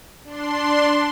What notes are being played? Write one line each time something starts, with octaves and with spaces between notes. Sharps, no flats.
D4 C6